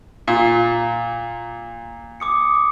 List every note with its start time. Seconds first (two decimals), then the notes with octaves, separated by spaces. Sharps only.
0.28 A#2
2.20 D6 D#6 C#7